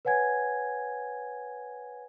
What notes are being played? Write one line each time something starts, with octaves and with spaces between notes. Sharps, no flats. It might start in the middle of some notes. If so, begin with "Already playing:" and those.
B4 C#5 F#5 G#5 G#6